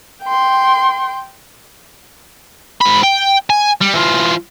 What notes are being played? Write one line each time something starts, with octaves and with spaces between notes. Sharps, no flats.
G5 C6
G#2 B5
G5
G#5
G3
E3 F4